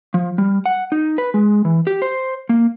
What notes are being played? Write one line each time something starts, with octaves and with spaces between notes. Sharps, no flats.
F3
G3
F#5
D#4
B4
G#3
E3
G4
C5
A#3